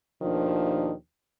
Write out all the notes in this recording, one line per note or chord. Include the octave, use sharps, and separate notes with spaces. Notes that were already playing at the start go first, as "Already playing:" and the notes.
D#2 B2 D#3 F3 D4